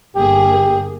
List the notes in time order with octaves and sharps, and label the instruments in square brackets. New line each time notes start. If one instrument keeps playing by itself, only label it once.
[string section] G1 A#3 G#4 [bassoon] G4